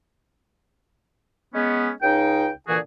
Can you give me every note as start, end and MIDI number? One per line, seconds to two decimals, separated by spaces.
1.55 1.90 56
1.55 1.90 59
1.55 1.90 61
2.02 2.49 37
2.02 2.49 49
2.02 2.49 63
2.02 2.49 79
2.68 2.79 46
2.68 2.79 50
2.68 2.79 52
2.68 2.79 66
2.68 2.79 68